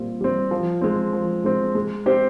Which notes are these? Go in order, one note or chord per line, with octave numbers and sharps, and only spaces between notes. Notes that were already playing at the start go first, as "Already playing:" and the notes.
Already playing: A#2 G3 C4
G3 C4
F3
G#3 C4
F3
G#3 C4
G#3
C4 G4 C5